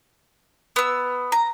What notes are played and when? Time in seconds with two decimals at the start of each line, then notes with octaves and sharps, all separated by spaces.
0.76 B3 E6
1.32 A#5